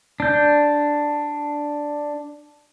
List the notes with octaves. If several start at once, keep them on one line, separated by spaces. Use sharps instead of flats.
D4 G6